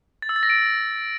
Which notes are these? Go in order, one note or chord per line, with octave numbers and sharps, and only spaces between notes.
A6
E6
A6
A#6
D7